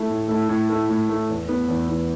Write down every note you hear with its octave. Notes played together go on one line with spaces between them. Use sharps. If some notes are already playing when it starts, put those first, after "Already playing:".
Already playing: A3 E4
A2
A3 E4
A2
A3 E4
A2
A3 E4
E2
E3 B3
E2
E3 B3